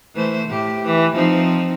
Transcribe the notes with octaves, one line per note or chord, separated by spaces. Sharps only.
E3 A3 C5
A2 G4
E3
F3 C4 D#4